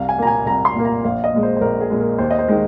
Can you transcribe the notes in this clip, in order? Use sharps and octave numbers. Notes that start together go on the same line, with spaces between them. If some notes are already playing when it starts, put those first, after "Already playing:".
Already playing: C2 F5
G#5
A#2 A#3 A#5
G#5
C2 A#5
C6
A#2 A#3
A#5
A#1 F5
D#5
A#2 G#3
C5
C5
A#1 A#4
G#4
A#2 G#3
A#4
D#2 C5
D#5
C5
D#3 G#3